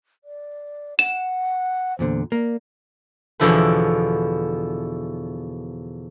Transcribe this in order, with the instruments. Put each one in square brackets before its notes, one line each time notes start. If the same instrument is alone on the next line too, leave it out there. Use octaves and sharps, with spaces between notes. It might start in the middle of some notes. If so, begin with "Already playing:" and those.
[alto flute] D5
[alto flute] F#5 [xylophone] E7
[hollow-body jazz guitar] E2 A#2 D3 [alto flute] C5
[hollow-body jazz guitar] A#3 [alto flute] D5
[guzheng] E2 B2 D3 F3 E4 B4